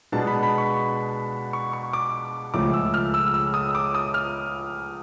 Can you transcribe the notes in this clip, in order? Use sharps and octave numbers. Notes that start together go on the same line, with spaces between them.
B2 G#3 B3 D4 A5
B5
B5
C#6
C#6
C#6
D6
C#2 C#3 F3 A3 C#4 D6
E6
F6
E6
E6
D#6
D6
D#6
F6